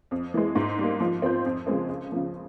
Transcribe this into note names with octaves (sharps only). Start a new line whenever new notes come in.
F2
E3 G#3
G#2
G3 A#3
F3
C4 F4 C5
F2
C#3 F3 G#3 C4
C#2
C#3 F3